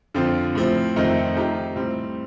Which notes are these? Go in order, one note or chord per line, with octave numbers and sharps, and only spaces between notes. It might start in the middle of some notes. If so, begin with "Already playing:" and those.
F2 D3 F3 C4 F4
A2 F3 C4
F2 D#3 A3 C4 D#4
F3 A3 D#4 G4
A2 G3 C4